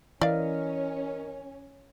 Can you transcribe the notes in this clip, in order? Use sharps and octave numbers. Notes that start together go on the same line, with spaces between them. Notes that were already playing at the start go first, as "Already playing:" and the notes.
E3 C#4 A#4 D5 D#5 F5